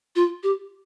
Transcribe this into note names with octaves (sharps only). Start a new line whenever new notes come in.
F4
G4